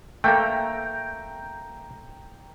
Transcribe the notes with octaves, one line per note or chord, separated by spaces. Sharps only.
A3 A#3 A4 G5 A#5